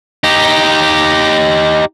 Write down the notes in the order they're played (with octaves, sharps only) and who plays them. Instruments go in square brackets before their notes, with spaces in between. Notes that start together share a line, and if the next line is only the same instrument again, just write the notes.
[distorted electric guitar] D#4 G4